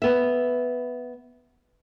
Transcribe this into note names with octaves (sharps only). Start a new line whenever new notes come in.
B3 E5